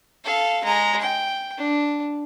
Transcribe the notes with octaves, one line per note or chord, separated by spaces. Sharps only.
A4 F5
G#3 A#5
G5
D4